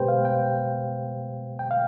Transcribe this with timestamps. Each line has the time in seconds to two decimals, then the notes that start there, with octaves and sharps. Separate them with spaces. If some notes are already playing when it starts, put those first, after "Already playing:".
Already playing: B2 G#3 B3 G4 B4 C5 G5
0.08 F5
0.25 G5
1.59 G5
1.71 F5